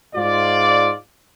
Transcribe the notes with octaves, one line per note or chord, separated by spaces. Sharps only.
G#2 F4 D5